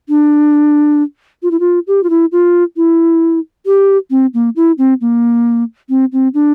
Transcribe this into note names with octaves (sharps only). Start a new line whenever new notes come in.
D4
F4
E4
F4
G4
F4
E4
F4
E4
G4
C4
A#3
E4
C4
A#3
C4
C4
D4